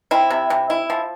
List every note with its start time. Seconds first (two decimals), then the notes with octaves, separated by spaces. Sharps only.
0.11 C4 E4
0.30 C3
0.50 C3
0.70 E4
0.90 F3